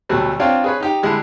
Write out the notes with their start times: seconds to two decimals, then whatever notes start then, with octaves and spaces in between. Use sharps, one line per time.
0.09 D2 B2 F#3 G3 A3
0.40 C4 D4 F4 C#5 F5 G5
0.64 G#4 B4 C#5
0.80 D#4 G4
1.03 D3 G3 G#3 E4